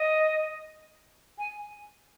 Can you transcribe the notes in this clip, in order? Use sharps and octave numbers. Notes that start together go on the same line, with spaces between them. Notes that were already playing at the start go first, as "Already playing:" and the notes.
Already playing: D#5
G#5